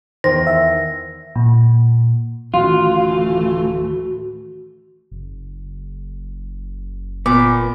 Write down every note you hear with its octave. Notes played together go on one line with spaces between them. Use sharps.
E2 D#3 C5 A#6
E5
A#2
D1 D#3 E3 A3 C#4 F4 F#4
F#1
A#2 B3 D6